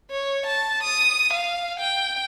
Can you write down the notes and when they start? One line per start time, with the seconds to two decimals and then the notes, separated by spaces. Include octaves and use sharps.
0.11 C#5
0.46 A5
0.83 D#6
1.33 F5
1.80 G5